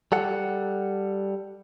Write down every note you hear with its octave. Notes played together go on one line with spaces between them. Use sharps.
G3 A4 F#5